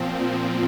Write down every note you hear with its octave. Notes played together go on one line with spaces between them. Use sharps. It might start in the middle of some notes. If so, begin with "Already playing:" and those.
Already playing: A#2 F3 C4